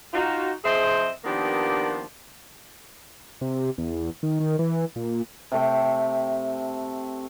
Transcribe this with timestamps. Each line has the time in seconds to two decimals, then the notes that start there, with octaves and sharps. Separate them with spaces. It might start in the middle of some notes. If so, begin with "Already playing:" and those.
0.14 D#4 F4 F#4
0.64 F3 C4 G#4 C5 D#5 E5
1.25 D#3 F3 A#3 B3 D4 G4
3.41 C3
3.78 E2
4.23 D#3
4.40 D#3
4.59 E3
4.96 A#2
5.52 C3 A3 G5